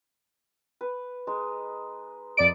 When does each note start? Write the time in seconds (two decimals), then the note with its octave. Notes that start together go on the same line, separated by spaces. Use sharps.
0.81 B4
1.27 G#3 D#4
2.37 F2 D5 D#5 D7